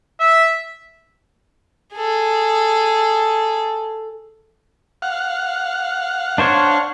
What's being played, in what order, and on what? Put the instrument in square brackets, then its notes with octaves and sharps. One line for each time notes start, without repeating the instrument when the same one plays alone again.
[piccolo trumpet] E5
[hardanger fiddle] G#4 A4
[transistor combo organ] F5 F#5
[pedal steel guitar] D4 C5 C#5